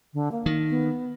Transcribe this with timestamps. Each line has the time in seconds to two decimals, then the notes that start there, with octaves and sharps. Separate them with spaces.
0.14 D3
0.32 A#3
0.46 D#3
0.70 B3